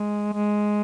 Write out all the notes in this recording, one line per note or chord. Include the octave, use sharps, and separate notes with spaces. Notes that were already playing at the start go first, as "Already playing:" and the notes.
Already playing: G#3
G#3